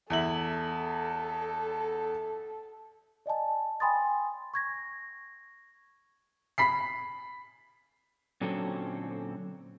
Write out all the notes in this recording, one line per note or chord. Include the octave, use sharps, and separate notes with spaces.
E2 E4 A4 F#7
D5 D#5 G#5 A5
G5 G#5 B5 C6 D#6 A6
C#6 G#6 A#6
B5 B6 C7
A#2 D3 F#3 C4 C#4 A4